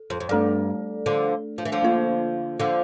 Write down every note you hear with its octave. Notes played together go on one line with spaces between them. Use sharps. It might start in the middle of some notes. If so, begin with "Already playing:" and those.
Already playing: A4
F2
F2
G2 A3 D4 A4 D5
D3 F3
F3
E3
D3 F3
A#3 F4 C5
D3 F3